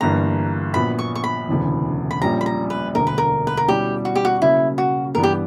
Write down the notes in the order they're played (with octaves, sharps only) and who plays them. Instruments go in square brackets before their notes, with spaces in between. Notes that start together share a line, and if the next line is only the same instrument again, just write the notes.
[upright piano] G1 G2 E3 A#3 [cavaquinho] A#5
[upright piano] A#1 A#2 F#3 B3 F#4 [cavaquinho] B5
[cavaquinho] C#6
C#6
B5
[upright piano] E1 D2 C#3 E3
[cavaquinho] B5
[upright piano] A#1 A#2 G3 C#4 G4 [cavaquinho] A#5
[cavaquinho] B5
A#5
B4
[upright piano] E1 D2 D3 [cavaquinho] A#4
[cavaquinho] B4
A#4
B4
A#4
[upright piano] B2 G3 C#4 E4 [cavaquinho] G4
[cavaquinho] F#4
G4
F#4
[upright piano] C#3 F#3 A#3 C#4 [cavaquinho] E4
[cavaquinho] F#4
[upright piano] G2 E3 G3 B3 [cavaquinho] A#4
[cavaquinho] G4